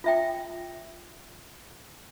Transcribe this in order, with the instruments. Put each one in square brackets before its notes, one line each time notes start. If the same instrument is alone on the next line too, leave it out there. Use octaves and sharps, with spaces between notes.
[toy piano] F4 E5 G5